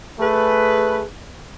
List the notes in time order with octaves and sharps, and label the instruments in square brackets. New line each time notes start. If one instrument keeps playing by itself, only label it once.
[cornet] A3 [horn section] G#4 B4